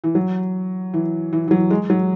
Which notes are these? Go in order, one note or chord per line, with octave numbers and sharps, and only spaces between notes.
E3
F#3
E3
E3
E3
F#3
G#3
F#3